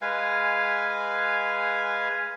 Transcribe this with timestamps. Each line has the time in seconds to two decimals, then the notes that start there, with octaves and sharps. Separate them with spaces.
0.02 G#3 B4 F5 G#5